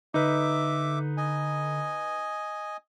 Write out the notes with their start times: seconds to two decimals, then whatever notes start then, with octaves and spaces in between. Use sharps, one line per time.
0.14 D3 D#4 B4 E5 D6
1.17 D#5 G#5